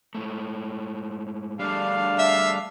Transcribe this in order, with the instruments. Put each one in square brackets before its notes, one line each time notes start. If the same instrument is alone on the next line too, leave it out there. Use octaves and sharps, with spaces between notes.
[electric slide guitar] G#2 A3
[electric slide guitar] G3 A3 [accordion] D4 F5
[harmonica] E5